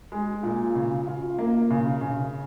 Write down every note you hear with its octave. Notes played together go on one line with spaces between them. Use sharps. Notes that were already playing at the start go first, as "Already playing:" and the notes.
G#3
A#2
C#3
F4
A#3
C#3
C#3